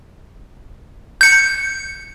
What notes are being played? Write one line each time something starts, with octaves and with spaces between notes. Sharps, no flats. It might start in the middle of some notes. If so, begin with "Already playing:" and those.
G6 C#7